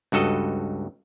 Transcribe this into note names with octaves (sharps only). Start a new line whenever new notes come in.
C#2 G2 F#4 A4 D#5